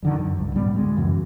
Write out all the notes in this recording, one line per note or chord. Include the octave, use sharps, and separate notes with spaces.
F2 D3 D#3
F#2
C#2 G2
A2 G3 B3
D2 G#3
F#2 C#3 E3